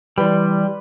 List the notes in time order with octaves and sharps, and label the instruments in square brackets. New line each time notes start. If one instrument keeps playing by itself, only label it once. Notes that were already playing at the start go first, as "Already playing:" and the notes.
[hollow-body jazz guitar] E3 G4 [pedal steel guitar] G3 [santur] B4 D5 C6